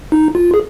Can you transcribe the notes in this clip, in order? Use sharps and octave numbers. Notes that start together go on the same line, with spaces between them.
D#4
F4
G#4